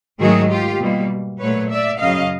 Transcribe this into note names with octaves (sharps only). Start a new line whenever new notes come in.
G#2 D#3 F#3 A3 F#4 G#4
F4 G4
B2 G3 A#3
A#2 F#3 A3 B4 C#5
D5 E5
F#2 C#3 F#3 D#5 F5